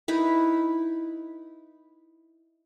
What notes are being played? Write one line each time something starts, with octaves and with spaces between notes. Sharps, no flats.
D#4 E4 B4